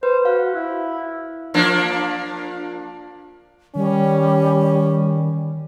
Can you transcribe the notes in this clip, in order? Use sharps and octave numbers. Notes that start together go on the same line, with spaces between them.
B4 C5
F#4 F5
E4
F3 A#3 D4
D#3 G3 C#4